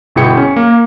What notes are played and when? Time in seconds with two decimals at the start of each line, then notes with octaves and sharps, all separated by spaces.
0.16 G1 B2 E4 G#4 G5 C#7
0.37 C#4
0.56 A#3